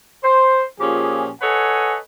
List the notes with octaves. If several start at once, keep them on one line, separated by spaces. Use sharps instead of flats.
C5
A#2 F3 C#4 G4 G#4
A4 B4 C#5 D#5 F#5 G#5